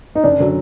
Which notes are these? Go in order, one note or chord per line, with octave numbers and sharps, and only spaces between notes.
D#4
F#1 D4
D3 F#3